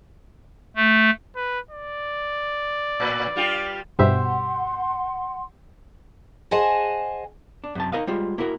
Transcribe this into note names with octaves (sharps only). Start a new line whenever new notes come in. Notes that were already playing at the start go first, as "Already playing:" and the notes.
A3
B4
D5
A2 B4
G3 F4 G4
G2 B2 G4 C5 E5 F#5 C6
G#4 C5 D#5 F#5 G#5 A5
D4
F#2 C3 A5
D#4 F4 A#4 D#5 F5
G3 G#3 F4 C5
A#3 E4 F#4 A#4